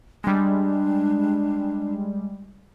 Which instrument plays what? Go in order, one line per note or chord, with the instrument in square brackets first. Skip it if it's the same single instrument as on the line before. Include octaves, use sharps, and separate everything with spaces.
[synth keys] G3 G#3 [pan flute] D4